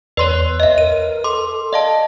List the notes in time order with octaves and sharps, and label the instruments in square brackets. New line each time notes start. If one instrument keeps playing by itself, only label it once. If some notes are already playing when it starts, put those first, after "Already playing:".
[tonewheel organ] E2 [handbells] B4 C#5 [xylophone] D5 C6
[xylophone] D#5 E5
[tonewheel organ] A#4 [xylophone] D#7
[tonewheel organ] A4 [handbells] C6 [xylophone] D6
[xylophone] D5 [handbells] D#5 F5 A5